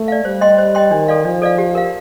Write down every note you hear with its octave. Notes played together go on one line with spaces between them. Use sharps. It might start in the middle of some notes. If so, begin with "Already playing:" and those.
Already playing: A3
D5 F5
G3 C5
D#5 G5 C6
C5
D#5 G5 C6
D#3 D4
A4 D5 F5
F3 D4
A4 D5 F5
G4
A#4 F5